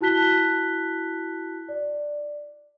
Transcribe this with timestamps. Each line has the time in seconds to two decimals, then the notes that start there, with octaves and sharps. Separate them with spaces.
0.01 E4 F#4 A5 F#6 B6 G7
1.69 D5